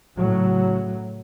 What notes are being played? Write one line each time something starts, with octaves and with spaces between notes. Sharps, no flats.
A2 C#3 F#3